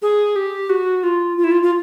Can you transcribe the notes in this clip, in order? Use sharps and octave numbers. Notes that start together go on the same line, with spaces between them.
G#4
G4
F#4
F4
F4
E4
F4
F4